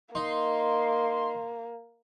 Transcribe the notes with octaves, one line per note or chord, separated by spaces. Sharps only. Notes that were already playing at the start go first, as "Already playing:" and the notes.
A#3 D#4 C6